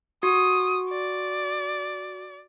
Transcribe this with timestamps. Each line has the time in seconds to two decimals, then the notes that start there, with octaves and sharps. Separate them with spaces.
0.23 F#4 C#6 D#6
0.90 D5